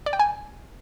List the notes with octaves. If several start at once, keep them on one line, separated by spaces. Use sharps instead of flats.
D5
G5
G#5